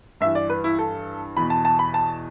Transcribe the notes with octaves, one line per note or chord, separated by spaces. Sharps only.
G2 E3 E5
D5
B4
E4
A4
E2 B2 B5
A5
A5
B5
A5